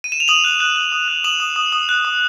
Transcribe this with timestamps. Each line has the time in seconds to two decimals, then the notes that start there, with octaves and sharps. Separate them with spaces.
0.04 D#7
0.12 E7
0.20 F7
0.28 D#6 E7 F#7
0.44 F#6
0.60 F#6
0.76 F#6
0.92 D#6
1.08 F#6
1.24 D#6 E7 F#7
1.40 D#6
1.56 D#6
1.72 D#6
1.89 F#6
2.05 D#6